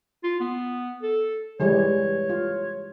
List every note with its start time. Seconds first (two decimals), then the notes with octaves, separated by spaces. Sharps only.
0.23 F4
0.40 B3
1.02 A4
1.60 E3 G3 G#3 C#5
2.30 F4